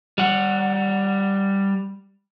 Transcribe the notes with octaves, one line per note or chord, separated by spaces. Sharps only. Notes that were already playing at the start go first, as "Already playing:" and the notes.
G3 F#5